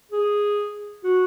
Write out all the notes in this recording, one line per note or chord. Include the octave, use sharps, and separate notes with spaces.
G#4
F#4